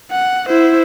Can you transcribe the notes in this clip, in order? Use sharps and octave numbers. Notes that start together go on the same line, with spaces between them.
F#5
E4 C5